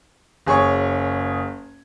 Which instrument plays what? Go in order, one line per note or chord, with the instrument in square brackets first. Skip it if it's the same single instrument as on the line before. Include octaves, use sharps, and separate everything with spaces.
[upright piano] F#1 G#4 C#5 C#6